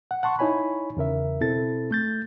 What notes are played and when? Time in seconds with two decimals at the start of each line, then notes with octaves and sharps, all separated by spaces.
0.11 F#5
0.23 F#5 A5 C6 C#6
0.39 D#4 E4 C#5 G#5 B5
0.97 E2 C#3 A#4 E5
1.41 B2 C4 E4 A4 A6
1.91 A3 G6 A6